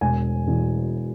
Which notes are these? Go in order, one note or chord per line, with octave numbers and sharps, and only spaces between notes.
E1 G#5
E2 B2